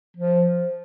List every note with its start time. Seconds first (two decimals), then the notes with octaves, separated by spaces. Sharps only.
0.17 F3